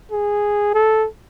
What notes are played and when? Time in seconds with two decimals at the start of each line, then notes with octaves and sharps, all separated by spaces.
0.11 G#4
0.74 A4